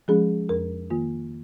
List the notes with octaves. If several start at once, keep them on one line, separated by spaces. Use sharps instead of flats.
F3 G#3 C#4 G#4
F2 A#4
D#3 A#3 F4